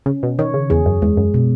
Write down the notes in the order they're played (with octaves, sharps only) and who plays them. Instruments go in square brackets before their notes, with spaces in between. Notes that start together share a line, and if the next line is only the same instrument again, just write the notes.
[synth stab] C#3 [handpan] C#4
[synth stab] B2
[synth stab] D#3 [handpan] C#5
[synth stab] C#3
[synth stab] E2 [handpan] G#4
[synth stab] F#2
[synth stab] E2 [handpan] G#3
[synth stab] F#2
[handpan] B2